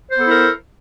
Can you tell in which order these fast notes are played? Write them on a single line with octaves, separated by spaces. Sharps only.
C5 B3 A4 E4 A#4